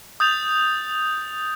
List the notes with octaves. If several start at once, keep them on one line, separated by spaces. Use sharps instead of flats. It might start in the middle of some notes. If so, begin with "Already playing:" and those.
D#6 G6 A6 F7